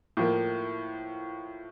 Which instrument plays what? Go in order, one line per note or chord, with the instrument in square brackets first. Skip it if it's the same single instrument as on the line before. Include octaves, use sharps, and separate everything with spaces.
[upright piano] A2 F3 A#3